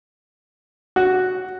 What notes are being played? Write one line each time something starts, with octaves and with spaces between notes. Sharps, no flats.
F#4